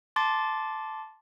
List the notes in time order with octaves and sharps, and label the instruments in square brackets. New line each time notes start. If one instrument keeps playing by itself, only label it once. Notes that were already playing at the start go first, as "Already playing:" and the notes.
[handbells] A5 C6 D6 A6